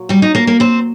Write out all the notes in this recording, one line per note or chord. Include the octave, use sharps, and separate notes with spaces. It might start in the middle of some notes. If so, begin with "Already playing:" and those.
Already playing: A#2 F#3
G3 G4
D#4
A#3 A#4
A#3 A#4
C4 C5